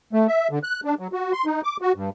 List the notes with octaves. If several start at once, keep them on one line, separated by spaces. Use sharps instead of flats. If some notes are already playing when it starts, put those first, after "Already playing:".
A3
E5
D3
F#6
D4
F#3
F#4
C6
D#4
D6
F#4
G2